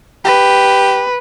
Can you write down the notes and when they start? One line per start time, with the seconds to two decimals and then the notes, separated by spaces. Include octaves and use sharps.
0.25 G4 B4